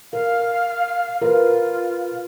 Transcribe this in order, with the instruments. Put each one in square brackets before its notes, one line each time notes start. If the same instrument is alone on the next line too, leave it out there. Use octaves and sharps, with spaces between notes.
[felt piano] A#4 [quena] F5
[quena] F4 [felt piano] A#4 B4